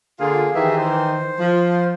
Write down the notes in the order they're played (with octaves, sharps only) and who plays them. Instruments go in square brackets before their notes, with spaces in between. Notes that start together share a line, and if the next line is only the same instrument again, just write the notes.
[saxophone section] D3 F4 [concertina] A#3 G#4
[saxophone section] D#3 E3 [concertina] G4 G#4 E5
[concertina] C5
[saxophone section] F3